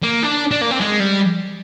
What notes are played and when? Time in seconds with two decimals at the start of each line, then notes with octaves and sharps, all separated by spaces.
0.03 A#3
0.23 D4
0.51 D4
0.61 A#3
0.71 C4
0.81 G#3
1.00 G3